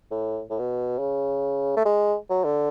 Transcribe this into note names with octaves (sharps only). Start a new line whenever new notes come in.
A2
A2
B2
C#3
A3
G#3
F#3
D3